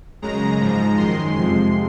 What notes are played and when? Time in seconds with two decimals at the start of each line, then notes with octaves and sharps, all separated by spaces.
0.22 F#2 C#3 G#3 A#5
0.59 G#2 F3 G#3
0.97 F#2 D#3 G#3 C6
1.35 F2 C3 F3 G#3 C6